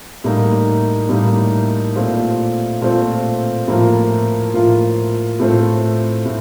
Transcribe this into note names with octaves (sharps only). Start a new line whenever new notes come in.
A2 G3 A#3 D#4
A2 G3 A#3 D#4
A#2 A3 C4 F4
A#2 A3 C4 F4
A2 F3 A#3 F4
A2 F3 A#3 F4
A2 A3 C4 F4
A2